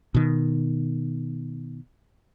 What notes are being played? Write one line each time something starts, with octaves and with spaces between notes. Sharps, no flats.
B2 D#3